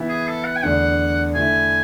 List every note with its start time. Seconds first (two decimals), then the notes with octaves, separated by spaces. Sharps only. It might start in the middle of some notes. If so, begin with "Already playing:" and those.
Already playing: E3 B3 E4
0.09 G#4
0.27 A4
0.45 F#5
0.56 G#5
0.63 E2 D3 A3 D4 F#5
1.35 D3 A3 E4 G#5